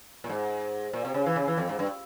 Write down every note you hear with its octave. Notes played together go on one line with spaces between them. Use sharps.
A#2
G#2
A#2
C3
C#3
E3
C#3
E3
F2
G#2
G2